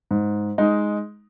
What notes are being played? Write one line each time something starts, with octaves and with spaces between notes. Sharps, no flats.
G#2
G#3 D#4